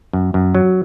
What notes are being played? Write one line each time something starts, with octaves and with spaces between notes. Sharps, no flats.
F#2
F#2
F#3